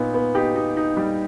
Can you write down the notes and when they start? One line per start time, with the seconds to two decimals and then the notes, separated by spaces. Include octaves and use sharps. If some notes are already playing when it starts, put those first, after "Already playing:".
Already playing: A#2 B3 D#4
0.14 B3
0.35 D#4 G4
0.56 D#4
0.77 D#4
0.97 G3